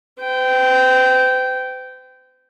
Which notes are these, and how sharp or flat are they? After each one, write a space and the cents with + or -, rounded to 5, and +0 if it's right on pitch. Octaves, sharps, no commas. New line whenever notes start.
C5 -45 G5 -15